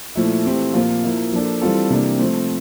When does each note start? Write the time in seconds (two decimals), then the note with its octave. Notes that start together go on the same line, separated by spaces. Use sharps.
0.16 A#2 F3 A3 E4
0.45 E3 A3 C4 G4
0.74 A#2 F3 A#3 F4
1.04 F3 A#3 E4
1.33 F3 A#3 D4 A4
1.61 E3 G3 C4 F4 A4
1.90 C3 E3 G3 A#3 D4
2.19 F3 A3 C4